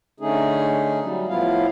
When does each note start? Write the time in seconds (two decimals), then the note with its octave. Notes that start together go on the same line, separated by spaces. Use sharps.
0.20 D3 A3 C#4 D#4 G#4
1.01 F#3 G3
1.28 A2 F3 B3 E4 F4 F5